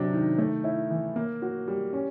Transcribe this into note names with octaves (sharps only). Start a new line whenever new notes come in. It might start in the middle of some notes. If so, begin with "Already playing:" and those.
Already playing: C3 F#3 D4
D#3
A3
E4
E3
A#3
F#4
G3
C#4